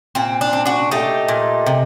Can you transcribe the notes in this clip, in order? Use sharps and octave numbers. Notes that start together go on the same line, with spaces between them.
A#2 C4
D4
C4
D4 F#4
A3 D#4 G4
A#2
C3